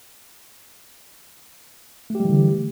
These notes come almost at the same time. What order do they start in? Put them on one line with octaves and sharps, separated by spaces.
A3 G4 G3 E3 D3